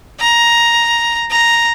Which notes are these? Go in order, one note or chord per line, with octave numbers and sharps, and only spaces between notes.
A#5
A#5